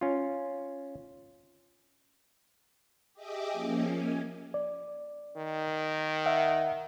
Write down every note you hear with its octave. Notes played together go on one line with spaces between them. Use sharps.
C#4 F4
G4 G#4 D#5 E5 D6
F3 A#3 C#4
G#5
D5
D#3
E5 F#5